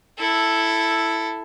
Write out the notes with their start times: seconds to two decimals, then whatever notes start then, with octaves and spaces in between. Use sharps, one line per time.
0.18 E4 A4